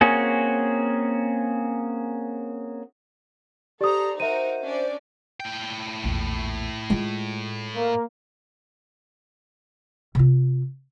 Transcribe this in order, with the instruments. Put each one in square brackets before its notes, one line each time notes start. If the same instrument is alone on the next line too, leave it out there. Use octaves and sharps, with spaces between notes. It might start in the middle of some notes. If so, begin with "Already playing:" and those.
[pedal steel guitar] A#3 C4 C#4 F#4 G#4
[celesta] G4 D#6 [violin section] A4 C5 A#5 [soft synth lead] D5
[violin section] D#4 F#4 A#4 [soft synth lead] C5 [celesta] E5 D#7
[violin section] C#4 D4 D5
[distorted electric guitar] A2 G5
[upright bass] A#1 E2
G#3 F4
[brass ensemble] A#3
[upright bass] C3 F4